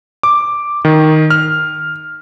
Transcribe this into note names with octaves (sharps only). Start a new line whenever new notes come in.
D6
D#3
F6